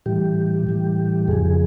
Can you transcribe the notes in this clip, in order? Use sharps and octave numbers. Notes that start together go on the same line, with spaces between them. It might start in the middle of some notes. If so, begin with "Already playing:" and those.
A2 E3 G3 G4
A2 E3 G3
F2 C#3 F3 G#4